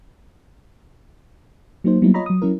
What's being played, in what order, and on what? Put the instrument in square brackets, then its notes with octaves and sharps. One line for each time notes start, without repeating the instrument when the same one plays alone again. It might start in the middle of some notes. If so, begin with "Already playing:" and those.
[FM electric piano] F#3 A#3 D#4 C5
F#3 G3 A#3 B3 D#4 E4
F4 C#5 D#5 A#5 B5
F#3 D#6
F#3 C#4 E4 A#4